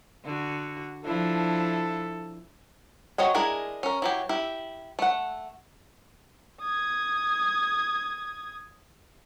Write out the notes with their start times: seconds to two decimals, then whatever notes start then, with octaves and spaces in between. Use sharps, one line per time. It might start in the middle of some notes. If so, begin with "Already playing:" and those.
0.25 D3 F#4
1.05 F3 D4 E4 A4
3.18 F#3 F#4 C#5 D#5 G5
3.35 G#3 D4 E4 G#4 A#4
3.83 C#4 A#4
4.02 E3 F#3 G4
4.29 E4 G4
4.99 A3 F#5
6.61 D#6 G#6